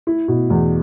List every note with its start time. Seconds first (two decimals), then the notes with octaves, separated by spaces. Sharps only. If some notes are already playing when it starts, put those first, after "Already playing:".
0.07 E4
0.28 B2
0.50 E2